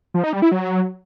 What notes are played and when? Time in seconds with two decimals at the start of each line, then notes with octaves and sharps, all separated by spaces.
0.14 F3
0.24 D#4
0.33 G3
0.42 E4
0.52 F#3